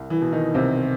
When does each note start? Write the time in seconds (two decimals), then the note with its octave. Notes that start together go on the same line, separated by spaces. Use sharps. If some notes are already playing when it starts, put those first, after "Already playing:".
Already playing: C2
0.10 E3 E4
0.22 B2
0.32 D#3 D#4
0.54 C2 C3 C4